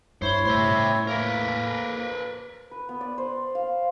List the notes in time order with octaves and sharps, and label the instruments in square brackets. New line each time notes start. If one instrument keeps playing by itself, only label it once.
[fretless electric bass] G2 [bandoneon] E4 C#5 [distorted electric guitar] C5
[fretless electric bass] A2 [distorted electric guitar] C5 E5
[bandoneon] A#3 [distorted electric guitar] A#4 B4
[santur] B4
B3
D5
C5
F5